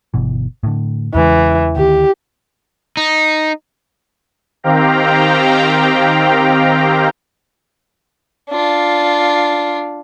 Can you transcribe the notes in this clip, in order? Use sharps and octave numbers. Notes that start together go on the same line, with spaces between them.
G1 B2 E3
A2 D3
E2 C#3 E3 G#3
D2 D#3 G4
D#4
D#3 C4 G4 F5 G5 A#5
D4 F4